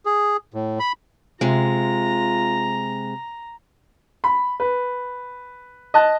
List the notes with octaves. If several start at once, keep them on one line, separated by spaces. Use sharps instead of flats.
G#4
A2
B5
C3 G#3 F4 A#5
B5
B4
D#5 A5 F#6